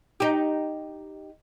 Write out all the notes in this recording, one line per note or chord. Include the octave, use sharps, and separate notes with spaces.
D#4 G4